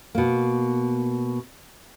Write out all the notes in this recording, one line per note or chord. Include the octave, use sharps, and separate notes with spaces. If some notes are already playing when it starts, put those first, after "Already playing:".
B2 A#3